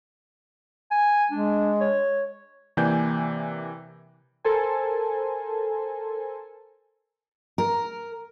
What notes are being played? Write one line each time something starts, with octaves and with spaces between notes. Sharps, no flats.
G#5
G#3 D4
C#5
C3 E3 A#3 D5 G#5 G6
A4 A#4 C5 G#5
A#4